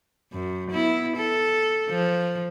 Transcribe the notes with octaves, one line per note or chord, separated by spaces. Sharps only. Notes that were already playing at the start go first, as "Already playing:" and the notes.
F#2
B3 E4
A4
F3